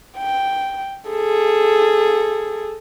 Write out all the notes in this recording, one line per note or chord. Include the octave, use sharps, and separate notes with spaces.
G5
G#4 A4